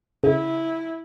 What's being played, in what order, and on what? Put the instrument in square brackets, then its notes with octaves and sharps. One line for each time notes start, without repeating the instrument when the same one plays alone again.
[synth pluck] C#3 [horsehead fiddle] E4